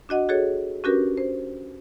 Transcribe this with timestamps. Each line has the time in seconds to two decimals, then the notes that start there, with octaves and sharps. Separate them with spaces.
0.09 D4 F#4 D#5 F#5
0.29 F#4 G#4 A4 C#5
0.84 C#4 D4 F#4 G4 A#4 B4
1.17 C5